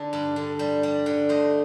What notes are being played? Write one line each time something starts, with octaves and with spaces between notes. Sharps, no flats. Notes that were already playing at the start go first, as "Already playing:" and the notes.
Already playing: D3 A4
G2
D3
G3
G3
D3
A3 C5 D#5